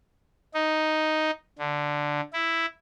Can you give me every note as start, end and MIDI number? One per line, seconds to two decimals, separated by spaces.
0.54 1.31 63
1.58 2.21 50
2.33 2.66 64